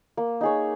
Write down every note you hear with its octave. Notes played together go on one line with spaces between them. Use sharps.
A#3
D#4 G#4 C#5